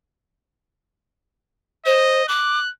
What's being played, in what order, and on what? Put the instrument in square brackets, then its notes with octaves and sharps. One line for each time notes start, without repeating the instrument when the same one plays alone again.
[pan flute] C5 [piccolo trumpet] D#5
[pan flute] D6 [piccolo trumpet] F#6